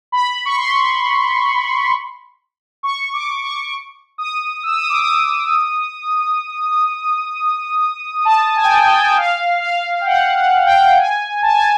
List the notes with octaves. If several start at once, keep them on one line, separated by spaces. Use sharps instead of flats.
B5
C#6
C6
C#6
D6
C#6
D#6
E6
D#6
D6
D#6
A5
G#5
G5
G#5
G5
G#5
G5
F5
F5
G5
F#5
F#5
G5
G#5
A5
G#5